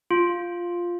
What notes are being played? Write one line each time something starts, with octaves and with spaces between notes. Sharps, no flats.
F4